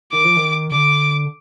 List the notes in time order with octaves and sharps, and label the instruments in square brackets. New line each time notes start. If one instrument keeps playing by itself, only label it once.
[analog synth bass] D#3 [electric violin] D6
[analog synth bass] F3
D#3
[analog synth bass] D3 [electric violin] D6